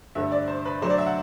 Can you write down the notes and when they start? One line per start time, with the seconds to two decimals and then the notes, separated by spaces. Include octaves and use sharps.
0.15 G2 D3 A3 E5
0.32 D5
0.48 C5
0.65 B4
0.82 D3 F#3 A3 D4 C5
0.90 D5
0.98 E5
1.06 F#5